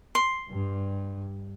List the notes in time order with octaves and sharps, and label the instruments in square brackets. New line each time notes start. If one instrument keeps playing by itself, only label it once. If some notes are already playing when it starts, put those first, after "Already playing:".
[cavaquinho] C6
[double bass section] G2